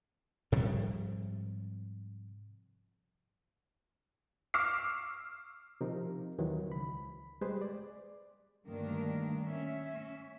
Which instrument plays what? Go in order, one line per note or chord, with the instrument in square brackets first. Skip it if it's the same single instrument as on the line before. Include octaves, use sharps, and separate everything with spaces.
[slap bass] G#2 C3 F3 G3
[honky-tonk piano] C#6 D6 E6 F6 C7
[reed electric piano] C3 F3 D#4 A#4
D#2 D#3 E3 F#3
C#2 B5
G3 G#3 G4 G#4 B4 C5
D5
[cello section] D2 G2 D#3 A#3 D4 A#4
C#4 E5